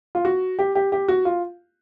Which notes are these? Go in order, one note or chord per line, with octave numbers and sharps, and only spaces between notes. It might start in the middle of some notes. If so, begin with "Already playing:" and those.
F4
F#4
G4
G4
G4
F#4
F4